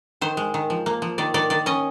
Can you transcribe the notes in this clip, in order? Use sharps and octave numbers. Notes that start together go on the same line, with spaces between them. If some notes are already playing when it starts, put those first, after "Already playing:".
D#3 C5
G#3
D#3
F3
A#3
F3
D#3 D5
D#3 D5
D#3 D5
C#4 D#5